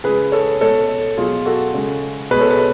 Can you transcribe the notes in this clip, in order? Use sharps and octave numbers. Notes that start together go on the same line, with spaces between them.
C#3 F3 G#3 G#4 B4
A4 C#5
B2 G#3 A4 C#5
B2 F#3 F4 G#4
F#4 A4
C#3 G#3
B2 G#3 G#4 B4
A4 C#5
G#4 B4